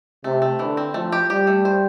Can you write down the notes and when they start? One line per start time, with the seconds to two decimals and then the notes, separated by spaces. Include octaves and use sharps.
0.24 C3 A3
0.42 A3
0.59 D3 E3
0.77 C4
0.94 F3 A3
1.12 G4
1.30 G3 G4
1.47 A3
1.65 C5